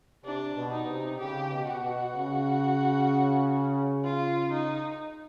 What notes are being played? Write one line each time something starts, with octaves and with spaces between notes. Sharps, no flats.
C3 D4
B2
D#4
C3
C#3 G4
B2
F#4
B2
C#3
F4
D#4